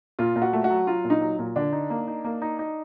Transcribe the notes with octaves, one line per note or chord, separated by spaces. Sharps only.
A#2 F4
A#2
F#4
A3
F#4
F#3
F#3 F4
A#2
D#4
F#3
A#2
D3 D4
D#4
A#3
D#4
A#3
D#4
D#4